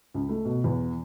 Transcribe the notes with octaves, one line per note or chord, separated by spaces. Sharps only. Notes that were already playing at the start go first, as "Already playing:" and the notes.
C#2
A3
B2
E2